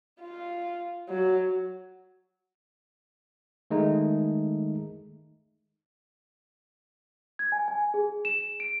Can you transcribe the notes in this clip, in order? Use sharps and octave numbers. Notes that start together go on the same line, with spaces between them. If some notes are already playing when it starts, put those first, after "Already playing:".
F4
F#3
D#3 G#3 A3 D#4
G#6
G#5
G#5
G#4
E7
D7